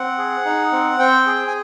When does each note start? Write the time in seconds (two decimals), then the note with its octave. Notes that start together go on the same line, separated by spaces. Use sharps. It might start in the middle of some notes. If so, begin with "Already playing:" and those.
Already playing: C4 F#5
0.18 G#4
0.45 D#4
0.72 C4
0.99 C4 G5
1.26 G#4
1.47 G#5